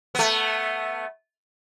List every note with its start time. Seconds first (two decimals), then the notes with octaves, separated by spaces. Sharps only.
0.15 A3 B3